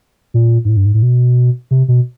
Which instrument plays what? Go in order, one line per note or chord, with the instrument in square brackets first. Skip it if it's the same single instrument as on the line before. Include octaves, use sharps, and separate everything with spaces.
[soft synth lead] A#2
G#2
A2
G2
G#2
A2
B2
C3
B2